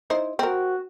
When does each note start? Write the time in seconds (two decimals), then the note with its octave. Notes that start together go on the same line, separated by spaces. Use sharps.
0.10 D#4 E4 C5
0.39 C4 F#4 A#4